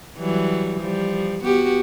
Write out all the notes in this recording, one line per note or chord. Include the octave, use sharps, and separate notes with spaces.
E3 F#3 G3
F3 G3
B3 F#4 G4